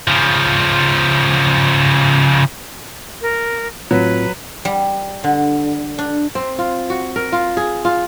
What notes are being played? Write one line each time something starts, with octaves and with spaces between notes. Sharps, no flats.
C#3 F3
A#4
A2 F#3 C4 F4 B4
G3
D3
D4
C4
F4
F#4
A#4
F4
G#4
F4